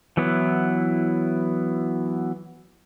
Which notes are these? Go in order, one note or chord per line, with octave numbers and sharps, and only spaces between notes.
E3 F#3 B3 E4